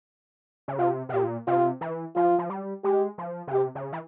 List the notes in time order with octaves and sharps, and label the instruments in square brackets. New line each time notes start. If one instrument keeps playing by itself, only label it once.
[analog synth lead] C#3
[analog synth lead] C3 [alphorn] F4
[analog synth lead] C3
[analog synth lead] A#2 [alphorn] G4
[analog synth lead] C3 [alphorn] F4
[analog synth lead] E3
[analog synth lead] F3 [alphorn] F4
[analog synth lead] F3
G3
[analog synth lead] G#3 [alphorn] G4
[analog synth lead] F3
C#3
[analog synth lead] C3 [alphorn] G4
[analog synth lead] C#3
E3